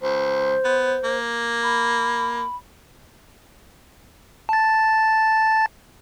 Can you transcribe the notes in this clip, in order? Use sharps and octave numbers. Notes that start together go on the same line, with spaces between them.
C#2 C5
B3
A#3
B5
A5 A6